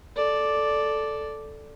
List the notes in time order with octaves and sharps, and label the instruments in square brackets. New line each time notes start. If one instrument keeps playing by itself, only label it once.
[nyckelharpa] A4 D5